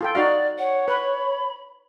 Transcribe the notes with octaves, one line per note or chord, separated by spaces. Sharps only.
F4 A4 G5
D#4 F#4 D5 F5
C#5 F#5
B4 B5